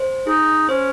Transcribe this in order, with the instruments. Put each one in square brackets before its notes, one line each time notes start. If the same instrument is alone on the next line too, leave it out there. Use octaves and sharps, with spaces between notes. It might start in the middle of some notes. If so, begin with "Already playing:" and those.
Already playing: [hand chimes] C5
[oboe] D#4 [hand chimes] G#4
[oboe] C#4 [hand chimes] C5